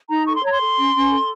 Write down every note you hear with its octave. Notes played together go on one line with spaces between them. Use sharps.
D#4 A#5
A4 C#6
C6
C#5 A#5
C6
A4
C#4
C#4
A4